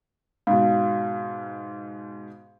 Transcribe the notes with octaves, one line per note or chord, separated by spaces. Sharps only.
G#2 B2 F5